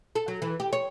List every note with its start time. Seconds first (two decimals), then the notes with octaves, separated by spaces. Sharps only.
0.15 A4
0.28 F#3
0.42 E3
0.60 G4
0.73 C#5